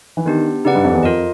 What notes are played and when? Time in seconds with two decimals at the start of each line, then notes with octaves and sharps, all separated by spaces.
0.17 E3
0.25 D#3 B3 D4 G4
0.65 C#3 D#4 G4 B4 D5 F#5
0.75 G2
0.84 F2
0.94 E2
1.03 F2 F4 A#4 D#5